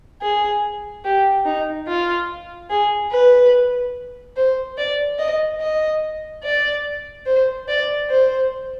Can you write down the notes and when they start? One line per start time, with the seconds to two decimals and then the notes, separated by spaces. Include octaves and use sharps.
0.22 G#4
1.05 G4
1.46 D#4
1.88 F4
2.70 G#4
3.12 B4
4.36 C5
4.78 D5
5.19 D#5
5.60 D#5
6.44 D5
7.26 C5
7.68 D5
8.10 C5